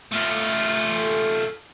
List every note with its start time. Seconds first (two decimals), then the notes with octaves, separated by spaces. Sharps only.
0.12 A3 F4